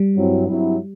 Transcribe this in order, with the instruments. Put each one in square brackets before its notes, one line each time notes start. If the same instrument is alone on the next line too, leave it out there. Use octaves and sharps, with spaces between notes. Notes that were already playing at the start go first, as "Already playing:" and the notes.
Already playing: [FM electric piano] G3
[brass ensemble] G2 F#3 C4 E4
G2 F#3 C4 E4